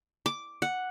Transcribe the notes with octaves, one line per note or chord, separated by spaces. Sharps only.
D6
F#5